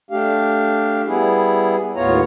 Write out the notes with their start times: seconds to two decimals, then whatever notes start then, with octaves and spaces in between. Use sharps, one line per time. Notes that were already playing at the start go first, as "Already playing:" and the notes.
0.10 A3 D4 G4 F5
1.06 G3 B3 E4 G#4
1.95 D#2 A2 B3 F4 C#5 A#5